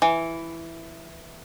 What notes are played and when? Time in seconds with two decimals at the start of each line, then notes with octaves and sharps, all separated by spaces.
0.02 E3